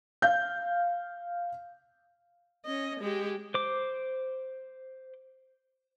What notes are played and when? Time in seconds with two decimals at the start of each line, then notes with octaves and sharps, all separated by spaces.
0.22 F5 G6
2.66 C#4 D#5
3.00 G#3 G4
3.54 C5 D6